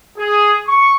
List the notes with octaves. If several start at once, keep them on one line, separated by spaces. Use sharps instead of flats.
G#4
C#6